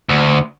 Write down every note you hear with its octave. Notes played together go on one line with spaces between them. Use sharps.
D2